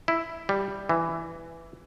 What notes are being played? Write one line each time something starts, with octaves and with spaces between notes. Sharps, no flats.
E4
G3
E3